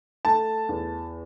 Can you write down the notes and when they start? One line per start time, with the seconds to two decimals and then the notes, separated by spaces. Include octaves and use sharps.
0.25 A3 A5
0.69 E2